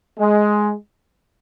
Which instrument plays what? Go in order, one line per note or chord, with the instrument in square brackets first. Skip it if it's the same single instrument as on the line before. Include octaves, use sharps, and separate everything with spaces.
[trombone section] G#3